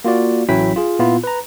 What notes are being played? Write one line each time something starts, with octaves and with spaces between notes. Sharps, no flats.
A#3 F4 F#4 D5
A1 F#3 C#4 E4 G5 B6
F4 G#4
A#2 B3 E4 F4
B4 A#5